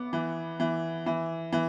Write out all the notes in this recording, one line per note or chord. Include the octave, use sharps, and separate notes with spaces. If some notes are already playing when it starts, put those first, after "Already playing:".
Already playing: B3 D6
E3
E3
E3
E3